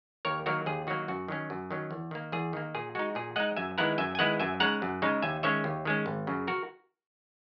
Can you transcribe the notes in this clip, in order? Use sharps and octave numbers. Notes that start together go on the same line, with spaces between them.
D#2 A#4 C#5
D#3 F#3 A#3 F#4 A#4
D#2 G#4
D#3 F#3 A#3 F#4
F#2 F#4
D#3 F#3 C#4
F#2
D#3 F#3 C#4
E2
D#3 A#3
E2 G#4
D#3 A#3
A#2 G#4
G#3 D#4 F#4
A#2 G#4
G#3 D#4 D#5 F#5
F#2 E5 G#5
D#3 G#3 B3 E4 F#5 A#5
F#2 E5 G#5
G#5
D#3 G#3 B3 E4 D#5 F#5
F#2 E5 G#5
C#3 G#3 D#4 F#5 A#5
F#2
C#3 G#3 D#4
D#2 E5 G#5
D#3 G#3 C#4 C#5 E5
D#2
D#3 G#3 C#4
G#1
F#2 C#3
F#4 A#4